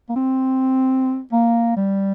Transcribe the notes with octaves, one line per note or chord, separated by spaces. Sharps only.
A#3
C4
A#3
G3